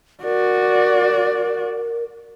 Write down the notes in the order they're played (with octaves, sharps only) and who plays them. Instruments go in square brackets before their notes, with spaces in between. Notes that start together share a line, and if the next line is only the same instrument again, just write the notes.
[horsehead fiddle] F#4 D5 [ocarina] A#4